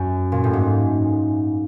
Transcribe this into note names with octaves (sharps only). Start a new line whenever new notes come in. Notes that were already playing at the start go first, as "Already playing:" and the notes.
Already playing: F#2
A#2
A2
G#2